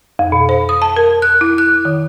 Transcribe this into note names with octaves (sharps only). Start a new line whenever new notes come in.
F2
B2
C5
D#6
A5
A#4
F#6
E4
F#6
D#3